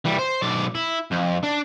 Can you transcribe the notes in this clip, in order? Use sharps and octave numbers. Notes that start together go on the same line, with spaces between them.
E3 G3
C5
B1 D5
E4
F2
D4